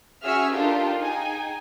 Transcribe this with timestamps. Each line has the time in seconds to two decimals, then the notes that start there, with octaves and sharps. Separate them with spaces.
0.22 C#4 F#4 G#4 E5 E6 F6
0.52 D4 D#4 F4 G4 A4 A#4
1.01 D#4 G#4 G5 G#5